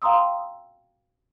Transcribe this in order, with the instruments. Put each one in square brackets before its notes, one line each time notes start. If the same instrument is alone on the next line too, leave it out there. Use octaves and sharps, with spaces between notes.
[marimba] F5 G5 A#5 C6 D#6 E6